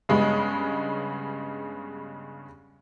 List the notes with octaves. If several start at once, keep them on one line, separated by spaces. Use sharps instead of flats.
G2 C#3 G#3 B3 C#4